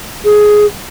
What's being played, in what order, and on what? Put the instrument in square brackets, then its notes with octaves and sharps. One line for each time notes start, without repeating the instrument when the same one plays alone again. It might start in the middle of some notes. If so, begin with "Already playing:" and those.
[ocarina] G#4